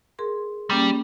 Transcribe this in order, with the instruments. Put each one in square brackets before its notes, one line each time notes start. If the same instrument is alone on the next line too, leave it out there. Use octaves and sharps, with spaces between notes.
[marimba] G#4 A#4 C6
[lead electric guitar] G3 [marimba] A#3 C#4